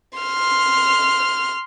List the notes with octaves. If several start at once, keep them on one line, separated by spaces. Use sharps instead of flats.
C6 F6